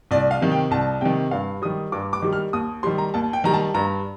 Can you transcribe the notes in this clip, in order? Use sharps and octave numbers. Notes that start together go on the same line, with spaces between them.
C2 D5
F5
C3 D#3
G5
C2 A5
C3 D#3 G5
G2 F5
D#3 G3 D#6
G2 D6
D6
D#3 G3
F6
D#2 D#6
D#3 G3 C6
A#5
D#2 A5
G5
D#3 G3 A#5
A5
G2 A#5